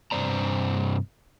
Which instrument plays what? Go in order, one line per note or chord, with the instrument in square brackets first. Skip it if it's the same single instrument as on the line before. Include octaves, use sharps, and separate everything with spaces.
[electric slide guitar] G2 C3 C5 D5 A#5